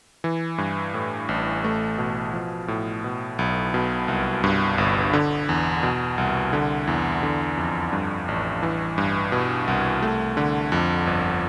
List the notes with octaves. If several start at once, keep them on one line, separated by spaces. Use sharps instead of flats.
E3
G2
A2
A1
A3
B2
F3
A2
B2
B1
B2
C2
G2
G1
D3
E2
B2
C2
D3
E2
D3
F2
G2
A1
E3
G2
B2
C2
A3
D3
F2
G1